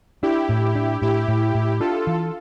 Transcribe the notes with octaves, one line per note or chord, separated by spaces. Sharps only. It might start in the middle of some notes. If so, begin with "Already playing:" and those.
D4 E4 G4
A2
D4
A2 E4 G4
A2
A2
D4 F4 A4
E3